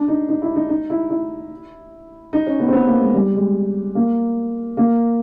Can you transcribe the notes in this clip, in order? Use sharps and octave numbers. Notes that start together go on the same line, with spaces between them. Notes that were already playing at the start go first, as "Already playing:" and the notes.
Already playing: D4
D#4
D#4
E4
D#4
D#4
E4
E4
D#4
C#4
B3
C4
B3
A#3
G#3
G3
G#3
A#3
A#3